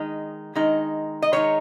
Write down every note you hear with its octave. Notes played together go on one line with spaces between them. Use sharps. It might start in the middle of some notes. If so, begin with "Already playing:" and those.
Already playing: D#3 G#3 D#4
D#3 G#3 D#4
D#5
D#3 G#3 D#4 C#5